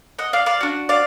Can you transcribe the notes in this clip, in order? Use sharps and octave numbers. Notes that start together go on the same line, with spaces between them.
D#5 F#5
D5 F5
D5 F5
D4 F#4
D5 F5